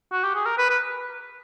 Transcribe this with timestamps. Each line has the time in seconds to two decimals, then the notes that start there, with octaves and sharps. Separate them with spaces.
0.12 F#4
0.23 G4
0.35 G#4
0.46 A#4
0.58 B4
0.69 B4